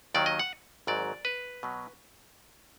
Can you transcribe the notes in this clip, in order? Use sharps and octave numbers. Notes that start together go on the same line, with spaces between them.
D#2 D#3 F#3 D5
D#5
F#5
G#1 G#2 F#3 D5
B4
B2 F#3